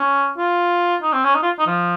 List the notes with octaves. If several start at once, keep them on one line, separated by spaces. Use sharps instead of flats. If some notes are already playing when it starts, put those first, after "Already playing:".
Already playing: C#4
F4
D#4
C4
C#4
D#4
F4
D#4
F3